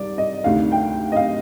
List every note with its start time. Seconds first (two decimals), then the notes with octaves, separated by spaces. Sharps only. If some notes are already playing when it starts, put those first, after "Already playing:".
Already playing: C2 C3 D#3 D5
0.18 D#5
0.44 D2 C3 D#3 F5
0.72 G5
1.12 D#5
1.16 F5